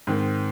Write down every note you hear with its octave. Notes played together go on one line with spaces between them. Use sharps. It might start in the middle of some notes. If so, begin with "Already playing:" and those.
G#2 D#3 C4